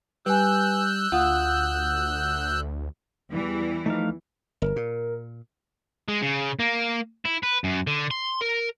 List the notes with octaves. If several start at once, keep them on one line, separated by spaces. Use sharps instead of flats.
G3 B4 G#5 E6 F#6 G6
D2 F4 F#5 D#6
E2 E3 G3
F3 A3 D#4 F5
G1 A#4
A#2
G#3
C#3
A#3
E4
B4
F#2
D3
C6
A#4